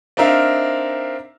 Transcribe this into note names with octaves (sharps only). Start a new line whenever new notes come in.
C4 D4 D#4 A#4 E5 F5